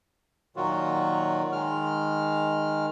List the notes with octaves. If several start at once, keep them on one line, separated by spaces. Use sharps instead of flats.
A#2 D#3 F#3 F4 F#4
D#3 G#3 F6